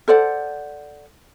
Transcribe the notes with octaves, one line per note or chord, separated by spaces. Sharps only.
A4 C5 D5 F#5